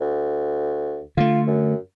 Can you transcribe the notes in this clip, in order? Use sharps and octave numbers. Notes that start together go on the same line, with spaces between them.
D2
D3 A3 F4
F#2